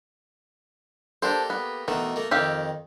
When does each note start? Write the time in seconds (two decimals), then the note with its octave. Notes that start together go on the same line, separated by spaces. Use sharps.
1.22 A#3 D4 G4 A4 C5
1.50 B3
1.88 B2 D#3 E3 A3
2.16 A3 A#3
2.31 F2 D#3 G4 E5 F5